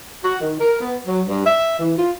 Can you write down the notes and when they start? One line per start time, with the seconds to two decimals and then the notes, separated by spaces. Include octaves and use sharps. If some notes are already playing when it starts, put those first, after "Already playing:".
0.23 F#4
0.40 D#3
0.59 A#4
0.80 B3
1.07 F#3
1.28 G2
1.45 E5
1.79 E3
1.96 F4